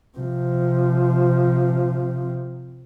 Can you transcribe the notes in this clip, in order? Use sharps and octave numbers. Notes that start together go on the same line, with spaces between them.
C3 F3